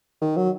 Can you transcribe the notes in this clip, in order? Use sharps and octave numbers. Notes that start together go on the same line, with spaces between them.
D#3
F#3